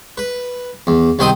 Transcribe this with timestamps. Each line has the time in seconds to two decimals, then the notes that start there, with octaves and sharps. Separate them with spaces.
0.18 B4
0.87 E2
1.19 C2 D#3 C4 C6 D#6